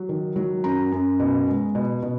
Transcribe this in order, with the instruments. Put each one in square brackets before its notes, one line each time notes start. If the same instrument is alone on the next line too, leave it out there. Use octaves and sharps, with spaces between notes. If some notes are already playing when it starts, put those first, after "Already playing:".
Already playing: [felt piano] F#3
D#3
F#3
F#2 A#5
F#2
B2
G#3
B2
B2